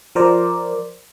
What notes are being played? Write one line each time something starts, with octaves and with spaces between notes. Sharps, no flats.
F3 A#4 C5 D5